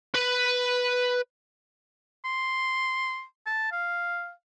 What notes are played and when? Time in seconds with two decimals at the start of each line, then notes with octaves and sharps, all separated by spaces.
0.14 B4 B5
2.25 C6
3.47 A5
3.72 F5